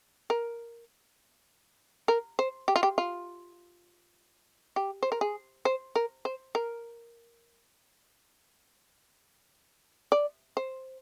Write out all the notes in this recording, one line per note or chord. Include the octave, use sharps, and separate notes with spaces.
A#4
A#4
C5
G4
F4
G4
F4
G4
C5
A#4
G#4
C5
A#4
C5
A#4
D5
C5